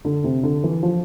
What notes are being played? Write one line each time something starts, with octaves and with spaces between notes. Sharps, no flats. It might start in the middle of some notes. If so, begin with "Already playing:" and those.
D3
C3
D3
E3
F3